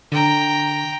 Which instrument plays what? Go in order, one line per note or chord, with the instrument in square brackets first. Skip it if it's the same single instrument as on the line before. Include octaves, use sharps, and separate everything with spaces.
[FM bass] D3 [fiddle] G5 A#5